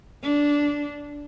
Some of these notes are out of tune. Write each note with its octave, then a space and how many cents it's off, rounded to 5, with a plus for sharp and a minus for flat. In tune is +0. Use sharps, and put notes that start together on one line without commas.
D4 -15